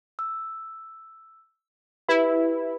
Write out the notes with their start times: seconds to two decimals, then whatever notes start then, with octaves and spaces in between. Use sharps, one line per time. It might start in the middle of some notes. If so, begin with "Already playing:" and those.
0.19 E6
2.08 E4 G4 B4